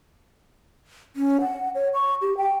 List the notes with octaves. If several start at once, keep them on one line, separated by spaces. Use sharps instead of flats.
C#4
F#5
C#5
C#6
G4
G5